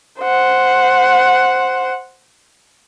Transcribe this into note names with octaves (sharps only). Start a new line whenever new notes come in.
C5 F#5